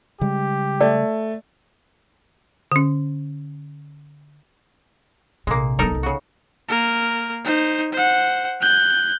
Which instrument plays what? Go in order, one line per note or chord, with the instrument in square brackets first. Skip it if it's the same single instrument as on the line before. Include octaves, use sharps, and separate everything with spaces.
[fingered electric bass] C#3 G3 G#3 [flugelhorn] G4
[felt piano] A3 [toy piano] D5
[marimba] D3 C#4
[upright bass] A#1 C3 [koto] G#3 A#3
[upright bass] F#3 B3 [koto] D#4 A4 A#4
[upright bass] C2 B3
[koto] C#3 F#4
[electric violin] A#3 A#4
D#4 C5
C5 F#5
F#6 G6